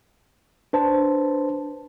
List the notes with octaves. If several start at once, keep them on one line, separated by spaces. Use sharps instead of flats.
D4 B4 C5 A5